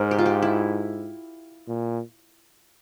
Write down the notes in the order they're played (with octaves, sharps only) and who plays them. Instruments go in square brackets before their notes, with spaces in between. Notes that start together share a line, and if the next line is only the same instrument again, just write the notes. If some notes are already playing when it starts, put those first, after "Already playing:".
Already playing: [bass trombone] G#2 [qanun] A#4 C5
[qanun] G4
F4
G4
E4
[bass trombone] A#2